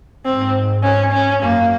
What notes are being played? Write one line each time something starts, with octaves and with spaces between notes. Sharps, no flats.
G#2 C4
C#4
C#4
F#2 A#3